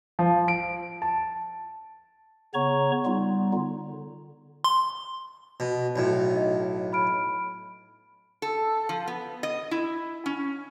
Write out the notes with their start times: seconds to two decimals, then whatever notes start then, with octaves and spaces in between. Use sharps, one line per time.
0.19 F3
0.48 D7
1.02 A5
2.54 C#3 B3 C#5 A#5 C#6
3.05 G3 B3 D#4 F4
3.53 D3
4.64 C6
5.60 B2
5.96 B1 A2
6.32 D#4 D#5
6.93 B5 F6 D7
8.42 A4
8.89 F3
9.08 B3
9.43 D#5
9.71 E4
10.26 C#4